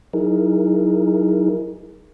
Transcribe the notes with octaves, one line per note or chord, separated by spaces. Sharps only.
F#3 D#4 E4 G#4 A#4